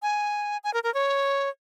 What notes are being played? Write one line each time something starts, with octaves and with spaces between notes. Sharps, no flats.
G#5
G#5
A#4
A#4
C#5